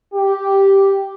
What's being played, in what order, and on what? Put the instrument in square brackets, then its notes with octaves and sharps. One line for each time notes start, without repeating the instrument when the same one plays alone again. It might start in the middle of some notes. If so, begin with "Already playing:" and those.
[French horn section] G4